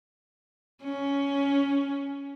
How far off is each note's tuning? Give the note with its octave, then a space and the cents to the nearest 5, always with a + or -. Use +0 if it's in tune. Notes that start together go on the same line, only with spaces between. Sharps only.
C#4 +10